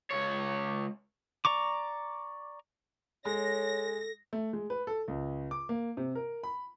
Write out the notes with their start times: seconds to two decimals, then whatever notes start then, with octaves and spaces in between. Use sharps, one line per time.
0.11 C#2 C#5
1.45 D5 A#5 C#6 D6
3.25 G#3 A4 C#5 A#6
4.33 A3
4.53 G#3
4.70 B4
4.87 A4
5.08 C#2
5.51 D6
5.69 A#3
5.97 C3
6.15 A#4
6.43 B5